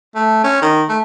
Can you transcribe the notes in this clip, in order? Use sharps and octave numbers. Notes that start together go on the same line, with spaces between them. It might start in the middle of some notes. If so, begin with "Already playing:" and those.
A3
C#4
D#3
A3